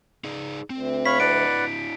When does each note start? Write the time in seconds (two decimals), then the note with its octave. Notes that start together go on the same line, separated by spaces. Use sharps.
0.24 D#4 G#4 D5
0.70 D2 C4
1.06 C#5 F5 B5 B6
1.20 D4 E4 B4 D5 D#5 F#5 D7